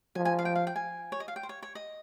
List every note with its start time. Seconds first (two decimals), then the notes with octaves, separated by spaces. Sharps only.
0.15 F3 G#5
0.25 G#5
0.39 F5
0.45 G5
0.55 F5
0.67 G5
0.76 G#5
1.12 C#5
1.20 D#5
1.28 F5
1.36 G5
1.43 C5
1.49 C#5
1.62 C#5
1.75 D#5